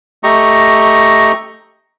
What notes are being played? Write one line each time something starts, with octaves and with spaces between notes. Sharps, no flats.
A3 G4 D#5 A#5 C#6